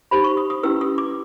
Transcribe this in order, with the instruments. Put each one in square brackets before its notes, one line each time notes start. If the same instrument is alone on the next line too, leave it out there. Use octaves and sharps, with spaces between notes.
[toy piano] D#4 G4 C5 B5
C#6
D#6
D#6
C#4 E4 G4 B4 E6
D#6
D6